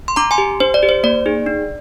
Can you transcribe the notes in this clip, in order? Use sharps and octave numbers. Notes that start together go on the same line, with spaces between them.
C6
D4 A#5 D6
G#5 C6
G4
D4 C5
D5
G4
C5
A#3 D5
D#4 G#4
D4